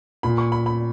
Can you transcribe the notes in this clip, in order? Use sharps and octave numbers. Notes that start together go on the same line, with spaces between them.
A#2 B5
C#6
B5
B5